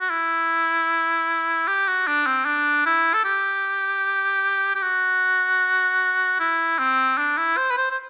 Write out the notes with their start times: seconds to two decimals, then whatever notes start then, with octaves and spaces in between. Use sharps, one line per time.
0.01 F#4
0.10 E4
1.68 G4
1.88 F#4
2.07 D4
2.27 C4
2.46 D4
2.86 E4
3.14 A4
3.25 G4
4.76 G4
4.82 F#4
6.40 E4
6.79 C4
7.18 D4
7.37 E4
7.57 C5
7.70 B4
7.77 C5
7.91 C5